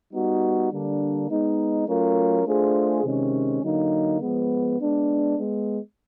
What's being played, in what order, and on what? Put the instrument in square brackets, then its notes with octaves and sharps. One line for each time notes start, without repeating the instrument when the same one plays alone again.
[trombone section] G3 B3 D#4 F#4
D3 G3 A#3 D4
G#3 B3 D#4
F#3 A3 C#4 F4 A#4
A3 D4 F4 G#4 C5
C3 D#3 G#3 C#4
D3 F#3 A#3 D#4
F3 G#3 B3
G#3 B3 D4
G#3 B3